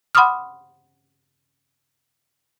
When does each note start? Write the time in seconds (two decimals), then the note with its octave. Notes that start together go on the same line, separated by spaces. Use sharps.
0.15 F#5 B5 C6 D6 D#6 F6